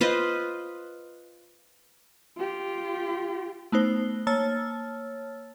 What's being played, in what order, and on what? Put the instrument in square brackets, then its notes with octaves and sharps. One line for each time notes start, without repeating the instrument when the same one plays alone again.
[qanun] F4 B4 C5 D#5
[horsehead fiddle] F4 G4
[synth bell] A3 B3 D#4 C5
A#3 C#5 A5 E6 F6 A6